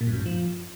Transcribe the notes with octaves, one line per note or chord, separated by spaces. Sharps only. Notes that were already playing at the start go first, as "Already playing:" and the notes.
A#2
G2
F#2
G#2
F3